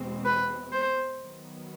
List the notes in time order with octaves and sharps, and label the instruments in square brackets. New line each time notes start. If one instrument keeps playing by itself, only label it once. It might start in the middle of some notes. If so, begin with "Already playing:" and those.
Already playing: [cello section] E2 B2 G#3 C4
[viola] B4
C5
[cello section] D#3 F#3 B3